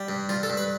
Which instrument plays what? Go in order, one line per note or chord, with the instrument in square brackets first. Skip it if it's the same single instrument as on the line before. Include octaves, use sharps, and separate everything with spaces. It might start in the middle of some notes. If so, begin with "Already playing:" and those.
Already playing: [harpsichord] G3
G2
G2 F4
A4
G2
B4